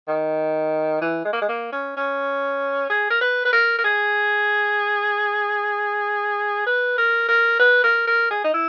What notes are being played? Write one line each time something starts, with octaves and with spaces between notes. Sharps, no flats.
D#3
E3
G#3
A#3
G#3
A#3
C#4
C#4
G#4
A#4
B4
B4
A#4
A#4
G#4
B4
A#4
A#4
B4
A#4
A#4
G#4
D#4
E4